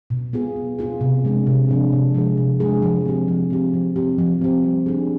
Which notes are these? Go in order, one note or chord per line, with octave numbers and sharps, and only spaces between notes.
B2
B3 F4 G#4
B2
B3 F4 G#4
C3
F3 G#3 D4 G#4
C3
F3 G#3 D4 G#4
C3
F3 G#3 D4 G#4
C3
F3 G#3 D4 G#4
F3
C4 G4
F3
C4 G4
F3
C4 G4
F3
C4 G4
G3
D4 G#4